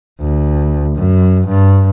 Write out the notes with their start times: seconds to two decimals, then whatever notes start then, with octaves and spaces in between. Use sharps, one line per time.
0.20 D2
0.96 F#2
1.48 G2